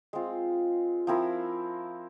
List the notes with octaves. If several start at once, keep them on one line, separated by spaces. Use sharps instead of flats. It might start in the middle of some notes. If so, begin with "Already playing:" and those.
G#3 C4 F4
F3 C4 E4 A#4